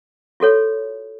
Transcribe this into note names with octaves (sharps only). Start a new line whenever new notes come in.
F4 F#4 A4 C#5